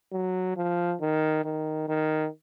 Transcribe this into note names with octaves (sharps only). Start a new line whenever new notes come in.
F#3
F3
D#3
D#3
D#3